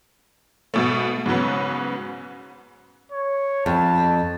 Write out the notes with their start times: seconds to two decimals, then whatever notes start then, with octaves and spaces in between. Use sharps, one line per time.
0.74 G#2 B2 A3
1.26 G#2 C#3 F#3 B3
3.12 C#5
3.66 F2 A5